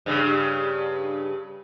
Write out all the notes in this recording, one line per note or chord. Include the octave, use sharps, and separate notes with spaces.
G2 C#3